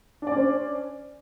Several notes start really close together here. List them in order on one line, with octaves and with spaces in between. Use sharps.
D4 D5 C#4 C5